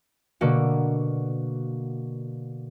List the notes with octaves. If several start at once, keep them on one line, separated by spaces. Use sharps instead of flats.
B2 D3 A#3 F#4